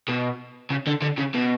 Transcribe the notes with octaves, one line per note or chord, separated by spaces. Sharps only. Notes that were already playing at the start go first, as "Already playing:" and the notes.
B2
C#3
D3
D3
C#3
B2